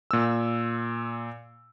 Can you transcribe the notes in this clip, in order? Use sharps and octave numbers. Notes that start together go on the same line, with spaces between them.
A#2 E6